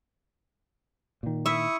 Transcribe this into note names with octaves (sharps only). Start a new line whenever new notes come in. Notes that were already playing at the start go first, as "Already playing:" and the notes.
A#2 D#3
E4 E5 C#6 D#6